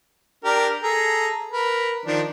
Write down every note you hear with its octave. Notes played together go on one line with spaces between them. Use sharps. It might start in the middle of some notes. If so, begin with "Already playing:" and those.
D4 G4 A#4
G#4 A4 A#5
A#4 B4
D#3 F3 D4